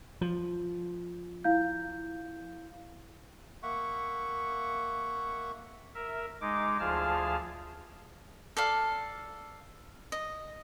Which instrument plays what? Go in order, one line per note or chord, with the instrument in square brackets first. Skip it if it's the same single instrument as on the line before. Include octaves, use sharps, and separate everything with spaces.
[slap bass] F3
[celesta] E4 F5 G6
[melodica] A#3 E5 F#5 C#6
[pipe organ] A#4 E5
G#3 D#4 D6
D2 F3 F4 G#4 A5 F6
[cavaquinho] A4 D5 F5
D#5